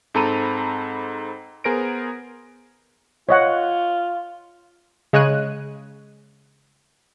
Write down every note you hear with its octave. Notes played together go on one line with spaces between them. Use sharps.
G#2 C4 A4 A#5 B5 D#7
B3 G#4 A#4 C5 A#6 D7
F4 C#5 D#5 F#5
C#3 G#3 C#5 F#6 D#7